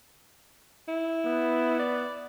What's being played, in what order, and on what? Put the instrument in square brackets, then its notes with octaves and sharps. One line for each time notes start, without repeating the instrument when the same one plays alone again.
[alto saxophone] E4
[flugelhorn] B3
[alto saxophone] D5